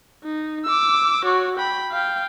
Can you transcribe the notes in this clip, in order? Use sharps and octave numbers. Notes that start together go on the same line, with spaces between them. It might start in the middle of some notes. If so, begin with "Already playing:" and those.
D#4
D6 E6
F#4 C#5
G5 B5
F5 G5